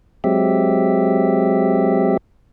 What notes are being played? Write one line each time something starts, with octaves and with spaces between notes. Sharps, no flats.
F#3 G#3 C4 G4 E5